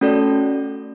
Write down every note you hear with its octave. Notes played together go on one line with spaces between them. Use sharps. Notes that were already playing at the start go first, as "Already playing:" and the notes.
A3 C#4 F#4 A4 D5